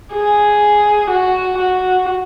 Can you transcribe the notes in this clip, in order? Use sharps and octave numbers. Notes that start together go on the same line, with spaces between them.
G#4
F#4
F#4